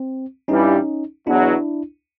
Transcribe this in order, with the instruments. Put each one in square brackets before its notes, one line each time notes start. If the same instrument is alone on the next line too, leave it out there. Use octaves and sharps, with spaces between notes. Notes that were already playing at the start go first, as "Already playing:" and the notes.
Already playing: [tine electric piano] C4
[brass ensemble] G2 E3 G3 [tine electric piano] C#4 D#4
[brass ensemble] E2 B2 F#3 [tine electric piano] D4 E4